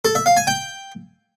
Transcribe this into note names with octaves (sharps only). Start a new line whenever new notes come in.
A4
E5
F5
G#5
G5